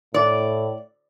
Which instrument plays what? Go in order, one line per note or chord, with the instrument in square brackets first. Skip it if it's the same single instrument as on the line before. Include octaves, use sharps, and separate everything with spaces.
[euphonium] A2 [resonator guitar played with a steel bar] D5